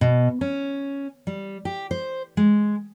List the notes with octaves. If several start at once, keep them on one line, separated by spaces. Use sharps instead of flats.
B2
C#4
G3
G4
C5
G#3